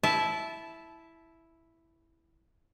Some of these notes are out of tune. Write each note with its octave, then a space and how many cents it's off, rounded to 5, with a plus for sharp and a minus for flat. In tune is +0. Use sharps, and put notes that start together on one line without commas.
E4 +0 E5 +0 A5 -20